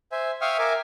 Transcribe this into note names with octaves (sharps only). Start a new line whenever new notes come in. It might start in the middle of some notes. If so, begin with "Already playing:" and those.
C5 E5 G#5
E5 F5 G5 C#6 D#6 F6
A#4 E5 G#5 D6